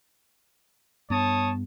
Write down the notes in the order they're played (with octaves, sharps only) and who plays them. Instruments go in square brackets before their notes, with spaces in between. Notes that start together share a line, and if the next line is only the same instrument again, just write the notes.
[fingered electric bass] G2 B3 [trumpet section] C#5 A5 D#6